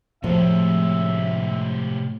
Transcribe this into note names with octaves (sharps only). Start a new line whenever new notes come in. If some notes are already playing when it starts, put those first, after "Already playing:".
A2 C3 F3 G#3 A3 E5